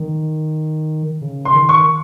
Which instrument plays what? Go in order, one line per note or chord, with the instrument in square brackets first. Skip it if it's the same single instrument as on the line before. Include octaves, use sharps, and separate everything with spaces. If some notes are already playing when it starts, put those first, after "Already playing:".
Already playing: [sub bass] D#3
C#3
[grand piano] C6
[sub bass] D#3
[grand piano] C#6